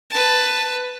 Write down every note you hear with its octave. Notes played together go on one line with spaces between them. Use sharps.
B4 A5